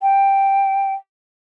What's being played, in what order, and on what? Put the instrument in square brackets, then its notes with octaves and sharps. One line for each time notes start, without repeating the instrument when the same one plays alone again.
[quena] G5